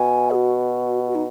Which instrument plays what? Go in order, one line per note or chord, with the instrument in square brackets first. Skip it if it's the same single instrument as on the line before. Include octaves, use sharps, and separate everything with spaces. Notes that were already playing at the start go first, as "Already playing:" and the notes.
Already playing: [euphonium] B2 [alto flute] G#5
[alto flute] G#4
F#4
F#4
D#4